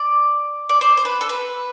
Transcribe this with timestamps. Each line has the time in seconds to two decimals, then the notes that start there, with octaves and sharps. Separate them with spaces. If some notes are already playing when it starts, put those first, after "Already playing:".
Already playing: D5
0.69 D5
0.81 C5
0.97 C5
1.05 B4
1.21 A4
1.29 B4